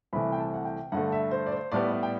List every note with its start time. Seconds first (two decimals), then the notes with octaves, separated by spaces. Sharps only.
0.13 C2 C3 E3 A3 B5
0.32 G5
0.39 A5
0.54 F#5
0.65 G5
0.92 G2 D3 A3 F#5
1.12 E5
1.31 C5
1.46 D5
1.52 C5
1.72 A2 G3 B3 D5
1.92 D5
2.03 G5